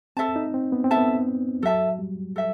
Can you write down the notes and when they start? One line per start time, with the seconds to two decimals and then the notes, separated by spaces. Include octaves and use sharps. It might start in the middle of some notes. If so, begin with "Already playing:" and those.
0.17 C4 A4 E5 A5
0.36 D#4
0.54 C4
0.72 B3
0.84 C4
0.91 A4 E5 A5
0.97 B3
1.63 F#3 A4 E5 A5
1.99 G3
2.36 A4 E5